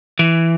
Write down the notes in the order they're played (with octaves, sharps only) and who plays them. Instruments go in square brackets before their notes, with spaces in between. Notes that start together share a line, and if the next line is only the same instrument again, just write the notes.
[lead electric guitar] E3